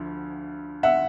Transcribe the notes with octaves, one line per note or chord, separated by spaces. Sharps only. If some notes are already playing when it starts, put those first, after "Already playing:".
Already playing: D2 D3 F3
E5 F#5